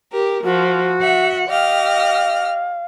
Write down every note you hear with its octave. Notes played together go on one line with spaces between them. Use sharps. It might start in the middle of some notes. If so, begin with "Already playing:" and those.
G4 A#4
F3 F#4
E5 F#5
G4 D#5 F5 F6